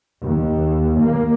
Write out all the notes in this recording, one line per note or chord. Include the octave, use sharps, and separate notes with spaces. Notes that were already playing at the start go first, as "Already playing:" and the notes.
D#2
A#3